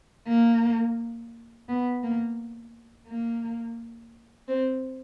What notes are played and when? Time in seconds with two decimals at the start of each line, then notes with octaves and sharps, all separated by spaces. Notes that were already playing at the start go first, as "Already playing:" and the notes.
0.28 A#3
1.68 B3
2.03 A#3
3.08 A#3
4.48 C4